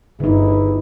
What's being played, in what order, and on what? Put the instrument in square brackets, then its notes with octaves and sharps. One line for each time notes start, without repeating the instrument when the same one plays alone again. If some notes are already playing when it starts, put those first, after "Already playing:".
[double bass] G1 [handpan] D3 D#4 [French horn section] E4 G#4 B4